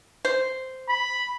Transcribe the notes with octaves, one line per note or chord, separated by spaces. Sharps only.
C5
B5